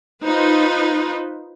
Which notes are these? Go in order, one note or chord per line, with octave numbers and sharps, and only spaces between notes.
D#4 F4 B4 C5